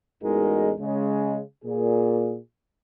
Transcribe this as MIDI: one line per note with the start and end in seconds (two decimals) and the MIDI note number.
0.23 0.72 33
0.23 0.72 40
0.23 0.72 56
0.23 0.72 63
0.23 0.72 66
0.23 0.72 70
0.79 1.39 49
0.79 1.39 56
1.64 2.36 46
1.64 2.36 68